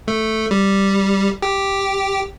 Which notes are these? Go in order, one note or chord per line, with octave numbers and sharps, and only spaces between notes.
A3
G3
G4